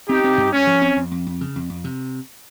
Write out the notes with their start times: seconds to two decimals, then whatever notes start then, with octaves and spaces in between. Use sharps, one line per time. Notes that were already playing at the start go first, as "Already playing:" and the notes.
0.09 C4 D#4 G4
0.24 C4
0.38 G2
0.53 G2 C#4
0.67 F3
0.82 C4
0.96 F2
1.11 F2
1.27 F2
1.41 C#3
1.56 F2
1.70 F2
1.84 C3